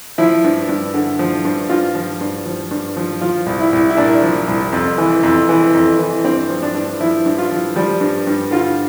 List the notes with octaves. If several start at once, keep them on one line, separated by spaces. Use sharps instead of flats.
F3 E4
G2
G2
D3
F3
G2
G2 F4
F3
G2
F3
G2
F3
F3 F4
C2
E4
C2
E4
A#2 D4
F3
C2
F2
E3
F2
E3
F2
E3
G2 C4
F3
D4
G2
F3 E4
G2
F4
F3
F3 G3
G2
G2
D3 F4